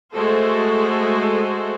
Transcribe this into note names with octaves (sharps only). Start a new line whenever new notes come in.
G#3 A3 F#4 A4 C5